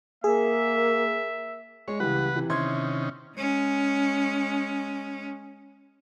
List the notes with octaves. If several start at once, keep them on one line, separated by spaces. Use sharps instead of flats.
A#3 G#4 A#4 E5
G#3 C#5
C#2 E3 G3 B4 F#5
C3 E3
C3 D#3 C#4 E4 C6 G#6
G#3 C#4